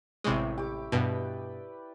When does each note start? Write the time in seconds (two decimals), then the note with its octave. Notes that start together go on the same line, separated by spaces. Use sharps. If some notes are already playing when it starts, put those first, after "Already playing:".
0.24 A1 C3 G#3 E4 C#5
0.58 G4 D6
0.92 G2 B2 B4 D5 G5